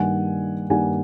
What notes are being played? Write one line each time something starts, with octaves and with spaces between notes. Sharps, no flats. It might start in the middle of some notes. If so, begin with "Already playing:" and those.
Already playing: G2 D#3 G3 A#3 F#5 G#5
G2 D#3 G3 A#3 F#5 G#5